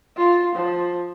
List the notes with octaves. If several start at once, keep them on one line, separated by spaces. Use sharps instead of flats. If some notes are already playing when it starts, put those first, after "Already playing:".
F4
F3